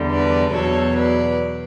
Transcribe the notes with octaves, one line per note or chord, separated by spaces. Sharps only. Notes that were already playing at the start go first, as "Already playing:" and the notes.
Already playing: E2 D3 G3
B4 D5
E2 B2 F#3 A4 C#5
B4 D5